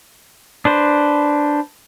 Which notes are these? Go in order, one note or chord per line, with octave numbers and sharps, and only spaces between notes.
D4 B4 C5